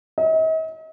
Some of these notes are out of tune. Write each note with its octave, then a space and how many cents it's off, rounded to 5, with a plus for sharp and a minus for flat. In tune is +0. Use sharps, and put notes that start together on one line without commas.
D#5 +45